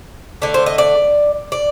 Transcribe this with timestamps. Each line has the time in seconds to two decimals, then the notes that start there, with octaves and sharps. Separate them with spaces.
0.42 D3 A3 D5
0.54 C5
0.66 D#5
0.78 D5
1.52 D5